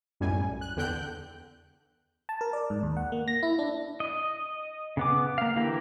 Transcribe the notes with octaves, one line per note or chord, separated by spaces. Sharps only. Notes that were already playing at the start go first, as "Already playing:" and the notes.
B1 F#2 A2 G3 G#5
F#6
E2 D3 G5 F#6 G6
A5
A#4
D5
G#2
D#2
F#5
A#3
A#6
E4
D4
D#5
C#3 B3 D6
A#3 F5
D3 E3 E4 G4 A#4